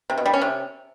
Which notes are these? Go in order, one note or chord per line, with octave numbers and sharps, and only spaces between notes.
C3
B2
G3
C#4
C3